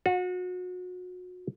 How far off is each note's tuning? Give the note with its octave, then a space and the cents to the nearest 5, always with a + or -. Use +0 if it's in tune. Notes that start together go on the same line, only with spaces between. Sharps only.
F#4 -30